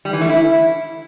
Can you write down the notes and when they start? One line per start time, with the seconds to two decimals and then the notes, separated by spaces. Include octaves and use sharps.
0.05 G3
0.13 E3
0.21 A3
0.29 E4